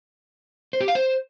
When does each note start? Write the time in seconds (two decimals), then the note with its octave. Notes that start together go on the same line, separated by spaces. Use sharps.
0.73 C5
0.81 G4
0.88 F5
0.95 C5